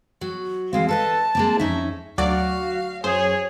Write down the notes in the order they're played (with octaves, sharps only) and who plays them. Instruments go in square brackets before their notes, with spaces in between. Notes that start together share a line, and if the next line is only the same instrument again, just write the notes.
[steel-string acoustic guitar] F#3 F#4
[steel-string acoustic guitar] E3 G#3 C4 [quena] F5
[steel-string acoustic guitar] A4 B4 D#5 [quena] A5
[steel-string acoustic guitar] G#3 A#3 C4
[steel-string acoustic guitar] F2 C#4 E5 [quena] D#4
[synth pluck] D2 F#3 D5 [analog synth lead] F#4 [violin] F5
[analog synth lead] F#2 [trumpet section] G#4 [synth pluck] C5 [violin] C#5